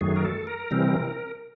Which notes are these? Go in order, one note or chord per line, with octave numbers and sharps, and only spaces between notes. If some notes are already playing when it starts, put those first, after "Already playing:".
F#2 D#3 F#3 A3 G#4
A#4
A4
A#4
C3 E3 G3 C4